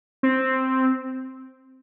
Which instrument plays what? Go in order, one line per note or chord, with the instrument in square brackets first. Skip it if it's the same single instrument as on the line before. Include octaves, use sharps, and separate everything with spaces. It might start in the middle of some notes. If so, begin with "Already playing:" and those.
[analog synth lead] C4